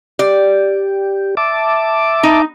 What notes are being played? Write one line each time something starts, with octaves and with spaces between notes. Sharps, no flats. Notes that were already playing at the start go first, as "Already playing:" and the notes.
G4 D5
E5 A5 D6
D#4